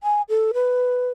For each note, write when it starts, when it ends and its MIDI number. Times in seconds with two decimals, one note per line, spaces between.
0.03 0.22 80
0.29 0.52 69
0.54 1.10 71